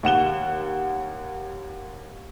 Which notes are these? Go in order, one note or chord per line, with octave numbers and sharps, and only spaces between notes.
D#2 F#5 E7 G7